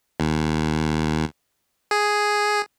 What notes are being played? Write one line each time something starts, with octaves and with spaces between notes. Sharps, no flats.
D#2
G#4